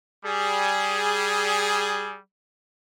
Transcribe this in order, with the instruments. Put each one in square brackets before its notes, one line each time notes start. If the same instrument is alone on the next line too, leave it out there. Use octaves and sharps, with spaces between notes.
[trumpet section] G3 G#4